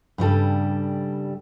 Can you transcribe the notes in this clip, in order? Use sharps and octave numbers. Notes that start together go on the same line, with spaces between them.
G2 C#3 G3 A4